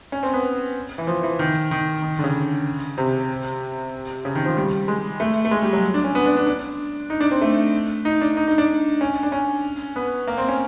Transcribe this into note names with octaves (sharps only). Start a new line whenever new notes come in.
C#4
C4
B3
E3
F3
E3
D#3
D#3
D#3
D3
C#3
C3
C#3
D#3
F3
G3
G#3
A3
A3
G#3
G3
F#3
D4
C#4
B3
D4
D4
D4
D#4
D4
C4
A3
D#4
D4
D#4
D#4
D4
C#4
D4
C#4
B3
A#3
C4
C#4